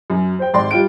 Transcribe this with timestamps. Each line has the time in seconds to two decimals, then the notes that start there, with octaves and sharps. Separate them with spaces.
0.10 F#2
0.39 C5 G5
0.53 G#1 D5 G5 C6
0.71 G3 F4 G5 D7